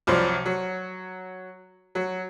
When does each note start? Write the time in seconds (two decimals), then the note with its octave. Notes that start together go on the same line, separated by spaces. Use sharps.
0.07 C2 F3 F#3 D5 C6
0.46 F#3
1.95 F#3